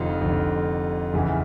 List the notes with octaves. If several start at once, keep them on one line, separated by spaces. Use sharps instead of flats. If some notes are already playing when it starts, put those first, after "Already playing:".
Already playing: F1 F2 D3 D#4 F4
F1 F2 D3
F#1 E2 C#3 E3